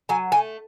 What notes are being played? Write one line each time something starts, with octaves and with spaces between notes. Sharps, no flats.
F#3 G#5
A3 G#5